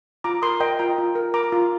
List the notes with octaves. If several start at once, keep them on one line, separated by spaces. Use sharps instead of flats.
F4 A#5 D6
A#4 C6 D#6
A#4 D#5 G5
F4 G5 A#5
F4
A#4
A#4 A#5 D6
F4